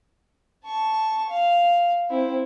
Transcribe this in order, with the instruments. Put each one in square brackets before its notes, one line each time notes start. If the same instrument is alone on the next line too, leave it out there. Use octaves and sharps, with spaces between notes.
[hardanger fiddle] A5 C#6
F5
C4 E4